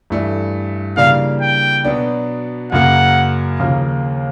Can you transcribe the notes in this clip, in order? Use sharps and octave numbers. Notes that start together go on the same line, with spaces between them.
G2 E3 A3 D4
C#3 E3 G3 A#3 D4 F5
G5
B2 F#3 B3 D4
F#2 C#3 F#3 A#3 F#5
D#2 C#3 F3 A#3